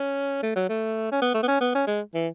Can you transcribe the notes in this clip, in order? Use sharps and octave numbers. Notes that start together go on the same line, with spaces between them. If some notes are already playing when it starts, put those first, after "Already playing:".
Already playing: C#4
A3
F#3
A3
C#4
B3
A3
B3
C#4
B3
C#4
G#3
E3